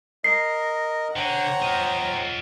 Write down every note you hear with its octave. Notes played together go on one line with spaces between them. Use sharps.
A#4 D#5 C7
D3 C5 C#5 F#5 G5 A#5
F4 D#5